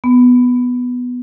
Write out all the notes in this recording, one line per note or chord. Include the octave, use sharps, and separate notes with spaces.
B3